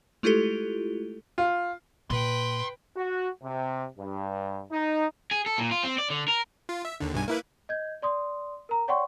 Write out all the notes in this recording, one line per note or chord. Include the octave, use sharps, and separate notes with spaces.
G#3 A3 E4 F4 G4 A4
F4
A#2 B4 G5 C6
F#4
C3
G2
D#4
G#4
A4
A#2
F4
C4
D5
D3
A#4
F4
E5
D#2 D3
B1 G2 G#5
A#3 E4 B4
D#5 G6 G#6
D5 C6 D#6
A#4 A#5
C#5 D5 F#5 G5 C6 C#6